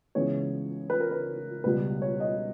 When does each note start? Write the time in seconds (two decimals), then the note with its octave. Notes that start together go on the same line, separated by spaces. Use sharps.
0.15 C#2 C#3 E3 G#3 B3 C#5
0.90 B4
1.00 A#4
1.11 B4
1.64 C#2 B2 G3 B3 B4
2.02 C#5
2.20 D#5